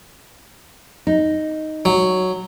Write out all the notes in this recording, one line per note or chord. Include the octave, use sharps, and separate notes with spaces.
D#4
F#3